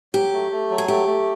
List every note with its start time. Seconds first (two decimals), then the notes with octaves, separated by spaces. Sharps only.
0.14 F#3 G4
0.33 A3
0.52 A3
0.70 F#3
0.78 G#4
0.88 A3 G4
1.07 A3